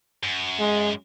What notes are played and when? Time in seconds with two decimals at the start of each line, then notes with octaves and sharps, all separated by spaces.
0.23 F#2
0.59 G#3